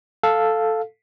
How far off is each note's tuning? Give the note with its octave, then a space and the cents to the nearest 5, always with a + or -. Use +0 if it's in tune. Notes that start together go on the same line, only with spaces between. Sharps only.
A4 +0 F5 +0